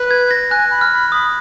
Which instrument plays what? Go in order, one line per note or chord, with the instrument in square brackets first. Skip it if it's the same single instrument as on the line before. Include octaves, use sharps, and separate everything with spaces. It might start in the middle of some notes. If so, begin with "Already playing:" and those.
Already playing: [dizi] B4
[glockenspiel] G#6
A#6
[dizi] G#5 [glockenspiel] F#6
[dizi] B5
[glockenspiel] F6
[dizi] B5
[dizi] B5 [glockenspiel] D#6